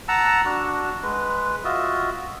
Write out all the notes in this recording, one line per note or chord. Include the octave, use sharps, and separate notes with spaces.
F#5 A5 A#5 E6
D4 F#4
G#3 B4
F4 F#4 D#5 E5